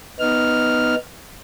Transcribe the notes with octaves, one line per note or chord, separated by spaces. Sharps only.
B3 D#4 F6